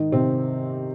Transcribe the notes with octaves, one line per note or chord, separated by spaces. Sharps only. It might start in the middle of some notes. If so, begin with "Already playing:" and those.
Already playing: G#2 D#3 D#4
C3 C4